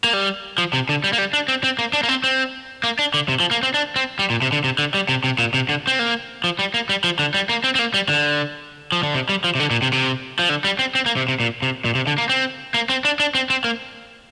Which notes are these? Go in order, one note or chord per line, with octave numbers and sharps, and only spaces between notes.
A#3
G3
F3
C3
D3
G3
A#3
G3
D4
C4
C4
A#3
D4
A#3
C4
C4
A#3
D4
D3
C3
F3
A#3
C4
D4
C4
G3
A#2
C3
D3
C3
D3
G3
C3
C3
A#2
C3
D3
C4
A#3
F3
G3
A#3
G3
F3
D3
G3
A#3
C4
C4
A#3
G3
D3
F3
D3
C3
G3
F3
C3
D3
A#2
C3
C3
F3
D3
G3
C4
C4
A#3
C3
C3
A#2
C3
A#2
C3
D3
A#3
C4
A#3
C4
D4
D4
C4
C4
A#3